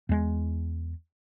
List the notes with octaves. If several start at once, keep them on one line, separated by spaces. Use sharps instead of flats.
E2 G#3